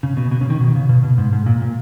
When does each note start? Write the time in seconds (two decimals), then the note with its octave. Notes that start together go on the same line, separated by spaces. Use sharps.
0.03 C#3
0.17 B2
0.31 B2
0.41 C#3
0.50 D#3
0.60 B2
0.75 C#3
0.89 B2
1.03 B2
1.18 G#2
1.33 G#2
1.46 A#2
1.62 A#2